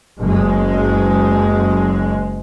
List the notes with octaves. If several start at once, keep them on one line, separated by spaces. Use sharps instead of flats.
F#1 G#3